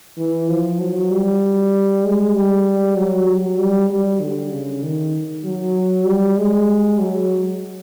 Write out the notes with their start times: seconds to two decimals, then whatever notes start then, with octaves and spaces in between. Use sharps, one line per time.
0.18 E3
0.49 F3
0.79 F#3
1.10 G3
2.04 G#3
2.35 G3
2.96 F#3
3.27 F#3
3.58 G3
3.90 G3
4.21 D3
4.52 C#3
4.82 D#3
5.44 F#3
6.06 G3
6.37 G#3
7.00 F#3